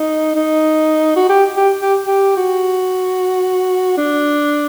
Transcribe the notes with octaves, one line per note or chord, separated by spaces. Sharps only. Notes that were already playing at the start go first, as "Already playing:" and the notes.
Already playing: D#4
D#4
F#4
G4
G4
G4
G4
F#4
D4